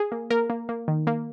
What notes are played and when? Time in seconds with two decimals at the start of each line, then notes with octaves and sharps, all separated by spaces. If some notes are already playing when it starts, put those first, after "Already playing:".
Already playing: G#4
0.12 A#3
0.30 A#3 A#4
0.50 A#3
0.69 A#3
0.88 D#3
1.07 A#3